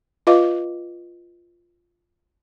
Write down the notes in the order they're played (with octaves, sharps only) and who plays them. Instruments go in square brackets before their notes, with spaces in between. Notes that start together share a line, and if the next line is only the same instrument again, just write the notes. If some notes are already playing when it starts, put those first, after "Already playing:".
[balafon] F4 B4 D#5 F5 D6